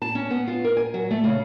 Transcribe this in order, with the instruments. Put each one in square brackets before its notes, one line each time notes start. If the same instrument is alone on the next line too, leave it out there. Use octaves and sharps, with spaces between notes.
[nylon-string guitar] A5
C#4
B3
F4
A#4
G#5
F#3
A3
C#3